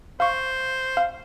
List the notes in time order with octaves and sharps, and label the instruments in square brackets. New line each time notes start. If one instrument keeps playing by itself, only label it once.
[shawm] C5 [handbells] F5 C#6
[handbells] F5